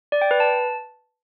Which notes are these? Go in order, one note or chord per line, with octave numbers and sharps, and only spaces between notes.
D5
G5
B4
A5